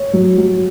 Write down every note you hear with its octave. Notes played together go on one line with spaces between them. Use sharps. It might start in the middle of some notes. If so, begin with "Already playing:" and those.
Already playing: C#5
F#3
F#3